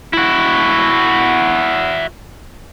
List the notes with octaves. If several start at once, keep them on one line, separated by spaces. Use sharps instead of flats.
E4 F#4